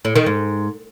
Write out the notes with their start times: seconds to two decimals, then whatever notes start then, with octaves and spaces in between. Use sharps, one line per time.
0.05 A2
0.16 D#3
0.26 G#2